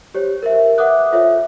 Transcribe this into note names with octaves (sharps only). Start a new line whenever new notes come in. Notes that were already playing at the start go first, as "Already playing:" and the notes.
G4 C5 C#5
A#4 C5 E5
B4 E5 F#5 D6 D#6 F#6
F4 A4 C5 C#5 E5